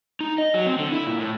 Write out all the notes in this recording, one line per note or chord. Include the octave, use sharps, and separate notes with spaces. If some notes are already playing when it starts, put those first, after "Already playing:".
D#4
D#5
F#3
C4
D3
E4
A#2
A2